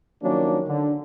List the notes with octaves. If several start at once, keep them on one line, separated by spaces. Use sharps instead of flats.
D#3 F3 F#3 A#3 C#4 D4
D3